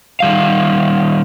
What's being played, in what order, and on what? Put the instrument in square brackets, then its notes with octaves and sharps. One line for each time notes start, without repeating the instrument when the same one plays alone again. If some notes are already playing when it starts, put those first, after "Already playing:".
[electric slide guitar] D#3 G3 F5